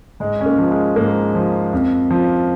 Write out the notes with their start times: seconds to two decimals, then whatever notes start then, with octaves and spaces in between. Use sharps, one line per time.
0.20 G#2 G#3
0.41 C#4
0.46 A#3
0.58 F3
0.71 G#3
0.96 G#2 A#3
1.35 F3
1.73 F2
2.11 F3